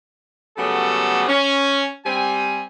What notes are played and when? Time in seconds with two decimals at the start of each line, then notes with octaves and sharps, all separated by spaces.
0.57 C#3 F#3 G3 A3 B3 A4
1.28 C#4
2.05 G3 C4 G#5